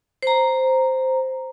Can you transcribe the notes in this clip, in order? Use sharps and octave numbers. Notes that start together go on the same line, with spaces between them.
C5 A#5